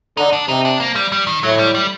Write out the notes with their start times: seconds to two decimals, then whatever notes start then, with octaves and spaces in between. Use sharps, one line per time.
0.17 D3 D#4
0.33 D4
0.48 C3 D#4
0.65 D4
0.80 A#3
0.95 G3
1.12 G3
1.27 D#3
1.43 A2 F#3
1.59 G3
1.75 G3